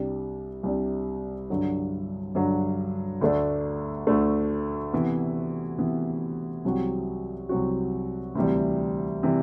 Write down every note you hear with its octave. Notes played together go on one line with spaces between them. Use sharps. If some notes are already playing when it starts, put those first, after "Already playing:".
Already playing: C2 C3 G3 D4
C2 C3 G3 D4
G2 D3 F#3
G2 D3 F#3
D2 D3 A3 D4
D2 D3 A3 D4
C3 E3 B3
C3 E3 B3
C2 C3 F#3 C4 F#4
C2 C3 F#3 C4 F#4
D2 C3 E3 G3
C3 E3 G3